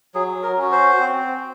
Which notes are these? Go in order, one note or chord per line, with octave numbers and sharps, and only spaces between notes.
F#3 G#4
A#4
C#4 F#4
C5
C4